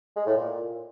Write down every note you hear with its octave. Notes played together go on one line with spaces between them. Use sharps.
G#3
A2
A#2